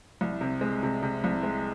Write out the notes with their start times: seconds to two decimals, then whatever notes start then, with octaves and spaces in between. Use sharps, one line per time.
0.21 C2
0.41 C3
0.61 G#3
0.83 C3
1.02 C3
1.24 C2
1.43 G#3